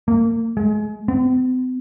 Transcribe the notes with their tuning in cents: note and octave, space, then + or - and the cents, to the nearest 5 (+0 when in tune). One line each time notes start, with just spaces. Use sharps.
A#3 -25
G#3 +30
C4 -45